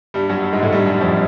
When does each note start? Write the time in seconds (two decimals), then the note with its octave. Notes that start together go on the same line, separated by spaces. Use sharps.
0.14 G2 G3
0.29 F#2 F#3
0.44 G2 G3
0.53 G#2 G#3
0.63 A2 A3
0.72 G2 G3
0.86 F#2 F#3
1.01 F2 F3